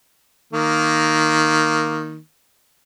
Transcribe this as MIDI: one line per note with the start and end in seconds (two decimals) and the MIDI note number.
0.53 2.18 51
0.53 2.18 58